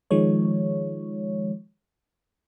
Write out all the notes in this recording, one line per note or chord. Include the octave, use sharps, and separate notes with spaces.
D#3 F3 G#3 C#5